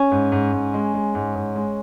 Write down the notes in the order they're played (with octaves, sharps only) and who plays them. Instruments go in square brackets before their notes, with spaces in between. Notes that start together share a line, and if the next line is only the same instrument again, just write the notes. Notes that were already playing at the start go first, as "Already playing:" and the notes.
Already playing: [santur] C#4
[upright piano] G#2
G#2
G#2
G#3
G#3
G#2
G#2
G#3